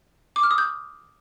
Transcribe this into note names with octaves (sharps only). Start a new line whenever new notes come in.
D6
F6
D#6
G6